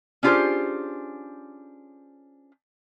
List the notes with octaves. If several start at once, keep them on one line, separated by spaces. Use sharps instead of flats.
C#4 D4 F4 G4 G#4 C5